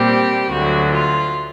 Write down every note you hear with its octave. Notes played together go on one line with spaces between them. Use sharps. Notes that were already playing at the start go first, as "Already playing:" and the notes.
Already playing: A#2 G3 C4 G4
D2 D3 F#3 F#4
F4